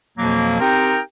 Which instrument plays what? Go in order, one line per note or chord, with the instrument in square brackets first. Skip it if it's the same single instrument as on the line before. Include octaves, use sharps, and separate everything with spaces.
[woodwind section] F2 B2 F3 F#3 A#3
C4 D#4 G4 A#4 G5 A#5